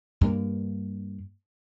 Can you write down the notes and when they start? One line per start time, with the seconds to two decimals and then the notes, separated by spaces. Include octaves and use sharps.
0.21 G2 A#3